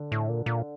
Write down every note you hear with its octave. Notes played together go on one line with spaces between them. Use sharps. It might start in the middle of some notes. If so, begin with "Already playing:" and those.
Already playing: D3
A2
A#2
A#2